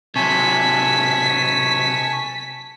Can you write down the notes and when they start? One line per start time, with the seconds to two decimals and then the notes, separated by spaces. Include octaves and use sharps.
0.16 C3 F#3 G#5 A5 C#6 B6